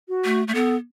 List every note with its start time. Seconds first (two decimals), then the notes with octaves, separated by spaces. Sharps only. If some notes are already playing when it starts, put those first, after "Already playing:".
0.09 F#4
0.25 A3
0.48 A3
0.54 B3 A4